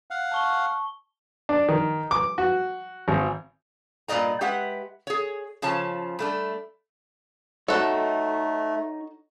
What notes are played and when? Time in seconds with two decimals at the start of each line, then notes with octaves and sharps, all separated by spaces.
0.11 F5 F#5
0.32 A5 C#6 G7
1.49 D4
1.69 D#3
2.11 D6
2.38 F#4
3.08 G#1
4.08 G2 A#2 D5 D#5 A#5
4.41 G#3 G4 B4 E5 F#5
5.07 G#4 C#5
5.62 C#3 F3 C#5 A5
6.19 G3 A3 D4
7.68 A3 D#4 F#4 A4 C#5